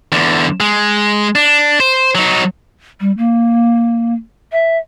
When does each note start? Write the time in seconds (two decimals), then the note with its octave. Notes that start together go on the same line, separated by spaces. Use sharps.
0.12 E2 D3
0.60 G#3
1.35 D4
1.80 C5
2.15 F#3 D#4
3.01 G3
3.18 A#3
4.52 E5